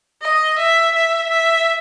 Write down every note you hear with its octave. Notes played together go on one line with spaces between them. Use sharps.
D#5
E5
E5
E5